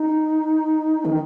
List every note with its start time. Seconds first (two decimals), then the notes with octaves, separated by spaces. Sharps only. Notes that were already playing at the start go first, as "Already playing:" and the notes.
Already playing: D#4
1.05 D#3